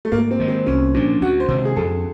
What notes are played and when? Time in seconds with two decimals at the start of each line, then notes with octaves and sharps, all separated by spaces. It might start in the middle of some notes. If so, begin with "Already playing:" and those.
0.05 A3
0.12 G#2 A#3
0.31 C4
0.40 D#3 G#3
0.48 C4
0.66 C2 C#4
0.94 A#2 F3 D4
1.21 D2 F#4
1.40 C5
1.48 C3 D#3 G#3
1.65 G#4
1.76 F2 A4